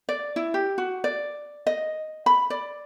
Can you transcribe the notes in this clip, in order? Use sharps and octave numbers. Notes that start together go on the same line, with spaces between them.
D5
E4
G4
F#4
D5
D#5
B5
D5